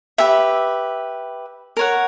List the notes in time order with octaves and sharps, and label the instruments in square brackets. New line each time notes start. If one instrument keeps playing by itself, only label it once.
[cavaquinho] G4 B4 E5
A#4 C#5 F#5